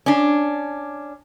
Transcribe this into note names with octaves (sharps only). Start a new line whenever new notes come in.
C#4 D4